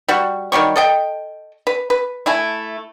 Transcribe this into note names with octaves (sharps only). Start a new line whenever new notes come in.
G3 F#4
D#3 F#3 G3 C#6
A4 D#5 G5
B4
B4
A3 E4 G#5